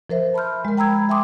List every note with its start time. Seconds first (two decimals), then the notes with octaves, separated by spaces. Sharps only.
0.10 F3 A#4 C5 E5
0.34 A5 B5 C6 F6 G6
0.65 G#3 A#4
0.77 G5 A#5 B5 E6 G#6
1.09 E5 G5 G#5 C6 D6 D#6